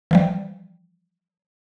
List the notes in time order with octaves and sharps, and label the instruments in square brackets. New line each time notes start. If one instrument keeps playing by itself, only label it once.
[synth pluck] E3 F3 G3